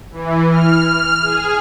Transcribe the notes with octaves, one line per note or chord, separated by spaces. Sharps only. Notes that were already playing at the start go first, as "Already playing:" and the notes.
E3
F6
F6
G#4